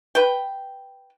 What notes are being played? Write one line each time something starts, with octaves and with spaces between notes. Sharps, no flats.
B4 G5